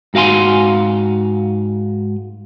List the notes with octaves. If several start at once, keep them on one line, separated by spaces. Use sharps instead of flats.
G#2 F#4 F5 G#5 C6